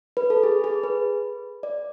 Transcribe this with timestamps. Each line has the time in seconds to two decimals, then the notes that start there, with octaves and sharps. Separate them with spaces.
0.17 B4
0.30 A4
0.43 G#4
0.64 G#4
0.83 B4
1.63 D5